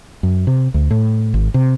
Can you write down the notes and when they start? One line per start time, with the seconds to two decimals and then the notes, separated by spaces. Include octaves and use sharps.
0.23 F#2
0.47 C3
0.74 D2
0.91 A2
1.34 G#1
1.54 C3